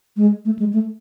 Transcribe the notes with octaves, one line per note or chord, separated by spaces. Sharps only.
G#3
A3
G#3
A3